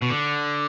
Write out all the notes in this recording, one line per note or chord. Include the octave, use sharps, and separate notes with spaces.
B2
D3